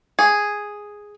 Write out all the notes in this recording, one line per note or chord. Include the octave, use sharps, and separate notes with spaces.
G#4